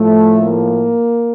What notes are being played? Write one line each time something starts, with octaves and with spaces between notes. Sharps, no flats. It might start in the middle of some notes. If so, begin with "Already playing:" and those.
Already playing: A2 F3 A3
A#3